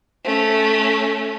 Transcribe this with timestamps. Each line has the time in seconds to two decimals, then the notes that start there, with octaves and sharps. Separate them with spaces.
0.24 A3 C#4